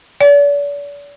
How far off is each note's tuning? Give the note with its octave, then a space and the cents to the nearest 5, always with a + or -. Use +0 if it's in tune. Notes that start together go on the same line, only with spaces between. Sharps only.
D5 -40